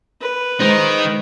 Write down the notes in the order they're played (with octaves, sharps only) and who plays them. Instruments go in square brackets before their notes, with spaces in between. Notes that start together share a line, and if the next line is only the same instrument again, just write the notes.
[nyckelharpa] B4
[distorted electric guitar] D#3 D#4 [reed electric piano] G#3 C5